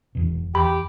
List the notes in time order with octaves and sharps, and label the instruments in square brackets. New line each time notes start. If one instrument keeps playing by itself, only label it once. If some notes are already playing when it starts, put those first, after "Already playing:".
[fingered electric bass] E1 E2 B2
[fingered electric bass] E2 [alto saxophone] G4 [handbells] B5